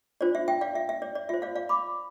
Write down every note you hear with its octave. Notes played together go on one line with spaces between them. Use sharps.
D4 F4 C5 D5
E5
E5 G5
D5 F5
E5
E5
D5
D5
F4 C5 E5
D5 F5
D5 F5
B5 D6